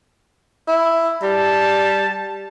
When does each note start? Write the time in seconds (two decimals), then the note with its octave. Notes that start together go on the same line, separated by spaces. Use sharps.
0.68 E4
1.23 G3 A5